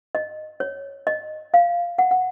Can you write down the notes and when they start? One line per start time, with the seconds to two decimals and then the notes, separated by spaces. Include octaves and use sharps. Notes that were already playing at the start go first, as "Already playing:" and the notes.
0.15 D#5
0.60 C#5
1.07 D#5
1.54 F5
1.99 F#5
2.11 F#5